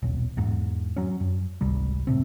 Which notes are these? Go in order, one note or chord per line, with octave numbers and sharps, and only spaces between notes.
D#1 B1
E2 G#2
F#3 C#4
F#2
G#1 C#2 C3 G3
F#1 A2 C3 C4